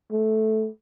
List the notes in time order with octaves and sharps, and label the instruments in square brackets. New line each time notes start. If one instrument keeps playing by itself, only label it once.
[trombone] A3